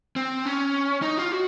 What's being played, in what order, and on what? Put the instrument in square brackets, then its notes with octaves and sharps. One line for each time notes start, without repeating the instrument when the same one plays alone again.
[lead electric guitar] C4
C#4
D#4
F4
F#4